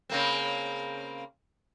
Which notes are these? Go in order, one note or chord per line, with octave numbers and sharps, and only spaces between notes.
C#3 A#3 C4